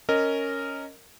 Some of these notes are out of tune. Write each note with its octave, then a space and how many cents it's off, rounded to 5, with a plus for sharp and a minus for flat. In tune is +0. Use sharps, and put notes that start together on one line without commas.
C#4 +0 A#4 -10 D#5 +0